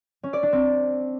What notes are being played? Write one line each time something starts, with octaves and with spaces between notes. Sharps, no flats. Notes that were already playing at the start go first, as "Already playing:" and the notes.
C#4
D5
D4
C4